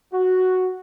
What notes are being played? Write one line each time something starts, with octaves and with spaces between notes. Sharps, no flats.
F#4